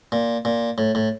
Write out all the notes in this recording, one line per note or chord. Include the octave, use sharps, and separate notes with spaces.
A#2
A#2
A2
A2